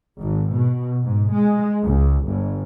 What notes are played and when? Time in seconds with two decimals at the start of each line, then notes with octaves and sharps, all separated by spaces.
0.20 G#1
0.54 B2
1.02 G#2
1.32 G#3
1.84 C#2
2.27 G1